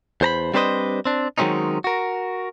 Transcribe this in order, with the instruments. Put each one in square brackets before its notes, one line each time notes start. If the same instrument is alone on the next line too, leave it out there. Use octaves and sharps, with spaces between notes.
[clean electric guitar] E2 C5 A#5 B5
G3 C4 D4 B4 C5 D#5
C4 D4
D#3 F#3 G#3 C4 C#4 D#4
F#4 A#4